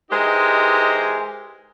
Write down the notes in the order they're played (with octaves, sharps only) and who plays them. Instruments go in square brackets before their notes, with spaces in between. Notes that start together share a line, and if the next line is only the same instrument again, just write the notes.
[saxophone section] E3 G#3 D#4 G4 A#4 C5